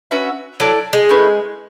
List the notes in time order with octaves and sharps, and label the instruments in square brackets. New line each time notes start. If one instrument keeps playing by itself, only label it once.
[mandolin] C#4 F#4 B4 E5
[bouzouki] F#3 [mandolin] E4 A4 D5 A5
[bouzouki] G#3
[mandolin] A3 C#4 E4 B4